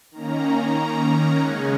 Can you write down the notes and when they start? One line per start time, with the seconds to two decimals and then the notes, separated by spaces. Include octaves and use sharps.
0.11 D#3 A#3 C#4 A#5
0.76 A#5
1.39 C#3 G#3 C#4 F#5